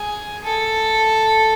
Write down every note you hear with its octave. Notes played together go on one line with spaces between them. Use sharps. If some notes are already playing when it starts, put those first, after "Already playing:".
Already playing: G#4
A4